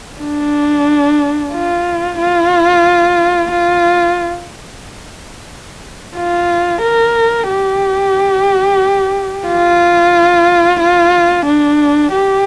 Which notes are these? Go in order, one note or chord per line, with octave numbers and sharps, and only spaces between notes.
D4
F4
F4
F4
F4
A#4
G4
F4
F4
D4
G4